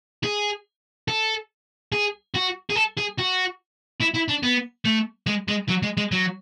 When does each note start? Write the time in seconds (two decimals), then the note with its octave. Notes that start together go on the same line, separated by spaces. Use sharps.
0.24 G#4
1.08 A4
1.92 G#4
2.34 F#4
2.70 G#4
2.75 A4
2.97 G#4
3.18 F#4
4.01 E4
4.15 E4
4.29 D4
4.43 B3
4.85 A3
5.27 G#3
5.48 G#3
5.69 F#3
5.83 G#3
5.97 G#3
6.12 F#3